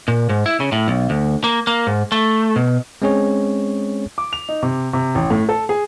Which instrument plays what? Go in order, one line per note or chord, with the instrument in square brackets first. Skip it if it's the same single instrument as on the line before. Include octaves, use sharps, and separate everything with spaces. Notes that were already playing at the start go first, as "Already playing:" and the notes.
[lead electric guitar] A#2
G#2
E4
C#3
A2
B1
D2
A#3
A#3
G#2
A3
B2
[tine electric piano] G#3 C4 C#4 G#4 C#5
[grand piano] D6
F7
D#4
C3
C3
A1
A2
A4
G#4